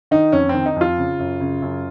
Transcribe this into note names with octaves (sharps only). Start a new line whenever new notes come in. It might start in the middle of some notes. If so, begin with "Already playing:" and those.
D#3 D#4
F2 C#4
D#3 C4
D#4
F2 F4
C#3
F#2
C#3
F#2